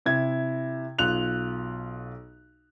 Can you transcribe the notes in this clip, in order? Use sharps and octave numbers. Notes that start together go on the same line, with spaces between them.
C3 E4 G#6
B1 F4 F#6 F7